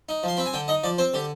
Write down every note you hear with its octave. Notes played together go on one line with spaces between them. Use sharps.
D#4
F3 C6
C4 B5
G#5
D3 G5
D#4 D#5
F3 D5
C4 C5
D3 G4